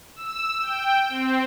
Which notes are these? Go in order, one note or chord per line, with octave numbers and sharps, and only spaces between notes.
E6
G5
C4